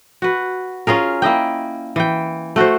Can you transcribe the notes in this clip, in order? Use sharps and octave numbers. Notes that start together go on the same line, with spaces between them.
F#4 B4
C#4 F4 G#4 A#4
A#3 E4 D#5 G5
E3 G5
A3 F#4 A4 C5